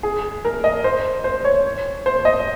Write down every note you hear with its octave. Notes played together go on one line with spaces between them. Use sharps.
G#4
A#4
D#5
C5
C5
C#5
C5
D#5